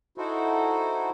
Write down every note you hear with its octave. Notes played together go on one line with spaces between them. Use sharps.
D#4 E4 F#4 A4 C5